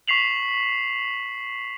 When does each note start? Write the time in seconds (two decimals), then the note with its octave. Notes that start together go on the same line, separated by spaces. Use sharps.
0.08 C#6 B6 C7 F7 F#7